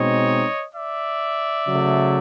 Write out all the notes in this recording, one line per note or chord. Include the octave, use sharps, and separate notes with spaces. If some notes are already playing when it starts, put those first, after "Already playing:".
Already playing: B2 G#3 C4 D#4 C#5 D#5
D5 E5
C#3 F#3 A3